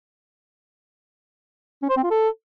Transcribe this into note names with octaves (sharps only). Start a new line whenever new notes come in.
C#4
C5
C4
F4
A4